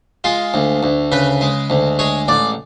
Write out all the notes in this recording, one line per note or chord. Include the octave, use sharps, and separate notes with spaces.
G#3 F4
D2
D2
C#3 B4
G#3
D2
G#3 C#5
A1 D5